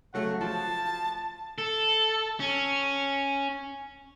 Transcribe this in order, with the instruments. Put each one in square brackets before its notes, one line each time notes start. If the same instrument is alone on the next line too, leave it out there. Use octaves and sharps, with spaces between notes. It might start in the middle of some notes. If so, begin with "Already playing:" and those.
[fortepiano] C#3 F#3 A3 [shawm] F#5
[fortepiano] F3 [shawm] A5
[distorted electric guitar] A4
C#4